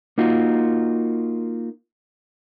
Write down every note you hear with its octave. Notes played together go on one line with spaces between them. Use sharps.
A#3 D#4 F4 F#4